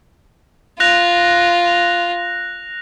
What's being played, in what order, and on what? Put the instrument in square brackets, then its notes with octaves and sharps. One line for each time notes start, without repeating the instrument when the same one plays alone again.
[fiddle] F4 [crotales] F#6 A#6 F7